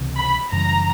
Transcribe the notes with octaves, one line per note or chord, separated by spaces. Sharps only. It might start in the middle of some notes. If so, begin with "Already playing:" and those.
Already playing: C#2 C3 E3
B5
F#2 C#3 E3 G3 A#5